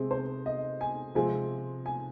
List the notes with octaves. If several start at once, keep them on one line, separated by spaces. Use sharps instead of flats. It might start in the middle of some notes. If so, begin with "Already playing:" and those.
Already playing: C3 G#3 C4 G#4
C5
D#5
G#5
C3 F3 G#3 C4 G#5
G#5